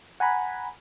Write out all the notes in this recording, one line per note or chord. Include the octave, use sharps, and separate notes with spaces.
F#5 G#5 A#5 B5